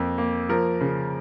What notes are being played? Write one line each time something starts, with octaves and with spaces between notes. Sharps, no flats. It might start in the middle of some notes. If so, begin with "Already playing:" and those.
Already playing: F2 A#3
A#3
F3 A#4
C#3